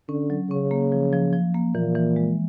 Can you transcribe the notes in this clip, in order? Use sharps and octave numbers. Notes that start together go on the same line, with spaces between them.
D3 C#4
F#3
C#3 C#4
A#3
F3
F3
F3
A#3
A#2 E3
E3
G#3